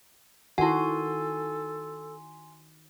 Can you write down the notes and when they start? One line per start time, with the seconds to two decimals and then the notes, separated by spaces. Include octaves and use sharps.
0.58 D#3 E4 F#4 A4 F#5 G#5 C6